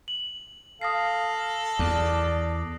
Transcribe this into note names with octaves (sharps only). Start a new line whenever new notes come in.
F#7
A4 F5 D#6 A#6 C7
E2 D5